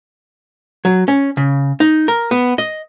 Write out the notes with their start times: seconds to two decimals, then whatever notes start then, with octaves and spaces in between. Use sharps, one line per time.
0.85 F#3
1.08 C#4
1.37 C#3
1.80 D#4
2.08 A#4
2.31 B3
2.58 D#5